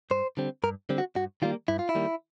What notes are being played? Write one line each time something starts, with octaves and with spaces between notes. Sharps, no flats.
G2 C5
D3 G3 C4
G2 A#4
D3 G3 C4
F#4
G2 F#4
D#3 G3 A#3 F4
G2 E4
F4
E4
D#3 G3 A#3